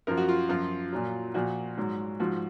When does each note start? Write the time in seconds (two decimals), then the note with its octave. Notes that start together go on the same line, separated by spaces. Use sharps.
0.07 F#2 F3 A#4
0.17 F#4
0.29 F4
0.49 F#2 F3 F4
0.93 A#2 F#3
1.34 A#2 F3 F#4
1.78 G#2 F#3
2.20 G#2 F3 F#4